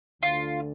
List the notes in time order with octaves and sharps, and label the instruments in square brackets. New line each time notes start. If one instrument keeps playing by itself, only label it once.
[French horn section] D2 D3 [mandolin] F4